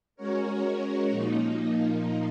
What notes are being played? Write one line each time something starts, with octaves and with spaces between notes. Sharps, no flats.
G#3 C#4 F#4 A#4 C#5
A#2 F3 A#3 D#4